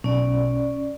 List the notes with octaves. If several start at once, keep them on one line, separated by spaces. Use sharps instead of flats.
B1 C#4 D5